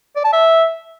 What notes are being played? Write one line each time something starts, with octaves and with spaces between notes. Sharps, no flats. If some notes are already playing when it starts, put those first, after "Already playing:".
D5
A5
E5